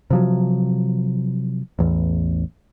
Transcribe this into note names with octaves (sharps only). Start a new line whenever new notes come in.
C3 F3 F#3
A1 E2